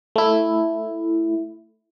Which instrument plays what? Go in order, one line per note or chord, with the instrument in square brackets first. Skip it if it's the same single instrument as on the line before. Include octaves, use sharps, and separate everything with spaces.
[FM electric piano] A3 E4